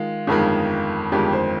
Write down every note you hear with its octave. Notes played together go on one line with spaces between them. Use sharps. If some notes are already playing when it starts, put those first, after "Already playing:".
Already playing: D#3 G#3 F4
G1 F2 D#3 G#3
G1 F2 D#3 G#3 G4
C5